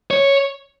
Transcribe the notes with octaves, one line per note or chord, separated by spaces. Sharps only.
C#5